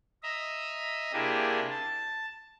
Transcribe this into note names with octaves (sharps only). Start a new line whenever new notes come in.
D#5 E5 A#5
C3 A#3 D4 E4 G4 G#4
A5